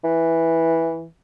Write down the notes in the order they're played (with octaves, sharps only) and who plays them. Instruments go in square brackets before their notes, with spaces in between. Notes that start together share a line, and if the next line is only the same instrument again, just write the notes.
[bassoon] E3